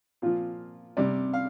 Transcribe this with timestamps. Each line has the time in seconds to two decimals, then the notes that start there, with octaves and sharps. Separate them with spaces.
0.22 A#2 F3 F4
0.97 C3 G3 D5
1.33 F5